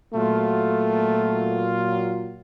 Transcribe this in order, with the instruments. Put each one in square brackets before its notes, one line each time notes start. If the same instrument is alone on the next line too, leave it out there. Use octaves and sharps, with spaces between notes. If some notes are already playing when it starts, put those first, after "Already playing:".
[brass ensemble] A#2 F#3 F4 [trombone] A3